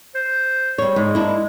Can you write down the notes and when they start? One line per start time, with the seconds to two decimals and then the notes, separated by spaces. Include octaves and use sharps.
0.15 C5
0.78 G3 C#5
0.96 G#2 G#3
1.15 A#3 D4 E4